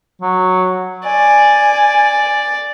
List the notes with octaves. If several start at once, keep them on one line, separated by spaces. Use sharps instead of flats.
F#3
D5 G#5